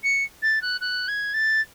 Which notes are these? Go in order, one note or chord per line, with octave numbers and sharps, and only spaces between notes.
C#7
A6
F#6
F#6
G#6
A6